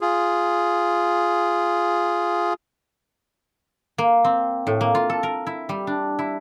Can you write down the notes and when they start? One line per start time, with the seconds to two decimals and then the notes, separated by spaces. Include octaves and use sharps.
0.01 F4 G#4
3.98 A#3
4.24 C4
4.67 A2
4.81 A#3
4.95 F4
5.10 A4
5.23 A#4
5.47 E4
5.69 G3
5.87 D4
6.19 E4